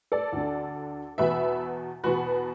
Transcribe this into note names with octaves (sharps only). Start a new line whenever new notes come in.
A4 D5
D2 D3
E2 B2 B4 E5
E2 B2 F#4 B4